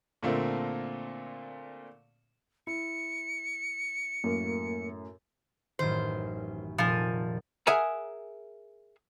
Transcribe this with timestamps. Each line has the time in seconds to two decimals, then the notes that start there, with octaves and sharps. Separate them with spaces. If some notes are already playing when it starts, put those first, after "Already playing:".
0.23 A#2 D3 A3 A#3 C4
2.67 E4 C#7
4.24 F#2 A2 A#3 A#4
5.79 A1 F#2 D#3 C5
6.78 F1 A#1 A#2 F3 G#5
7.67 G#4 A#4 E5 F#5 G#5 A#5